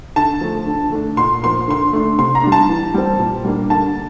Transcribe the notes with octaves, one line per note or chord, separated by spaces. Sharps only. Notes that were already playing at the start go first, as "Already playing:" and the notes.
D3 A5
F3 A3
D3
A3 D4
A#2 C6
F3 A#3 C6
D3 C6
A3 D4
C3 C6
A#5
G3 D4
A5
E3
G3 C4
A#2
G3 A#3 D4
D3 A5